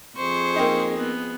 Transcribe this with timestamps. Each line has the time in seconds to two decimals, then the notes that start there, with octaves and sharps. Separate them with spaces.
0.17 F2 G#4 C5 C#6
0.56 A#3 C4 D#4
0.97 B3